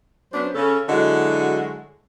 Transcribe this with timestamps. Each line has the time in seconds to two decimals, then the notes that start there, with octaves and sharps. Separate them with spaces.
0.33 F#3 B3 C#4 D4 C5
0.55 C#3 C#4 A4
0.89 D3 F#3 G#3 E4 F#4 D#5